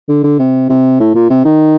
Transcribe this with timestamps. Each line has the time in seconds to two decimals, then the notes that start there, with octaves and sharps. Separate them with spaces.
0.09 D3
0.23 D3
0.39 C3
0.69 C3
1.00 A2
1.15 A#2
1.30 C3
1.45 D#3